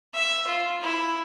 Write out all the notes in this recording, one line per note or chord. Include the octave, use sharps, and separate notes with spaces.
E5
F4
E4